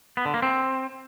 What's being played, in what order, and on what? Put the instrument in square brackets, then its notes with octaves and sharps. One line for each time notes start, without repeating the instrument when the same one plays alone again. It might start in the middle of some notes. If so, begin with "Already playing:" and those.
[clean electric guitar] B3
D3
A#3
C4